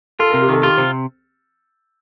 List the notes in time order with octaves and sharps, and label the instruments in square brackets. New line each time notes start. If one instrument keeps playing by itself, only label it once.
[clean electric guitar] F4 [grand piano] A4
[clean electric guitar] C3 [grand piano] A#4
[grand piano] G4
[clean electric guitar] D#3 [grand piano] A4
[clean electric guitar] F4 [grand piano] G4
[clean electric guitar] C3 [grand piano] C4